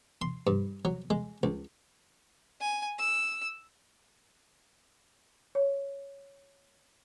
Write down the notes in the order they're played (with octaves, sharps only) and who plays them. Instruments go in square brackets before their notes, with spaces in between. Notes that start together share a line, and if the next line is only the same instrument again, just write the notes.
[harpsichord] C6
G2
F#3
G#3
C#2
[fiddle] G#5
E6
[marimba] C#5